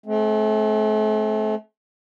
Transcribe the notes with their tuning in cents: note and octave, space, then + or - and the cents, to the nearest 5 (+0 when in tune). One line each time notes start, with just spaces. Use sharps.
A3 -40 C4 +20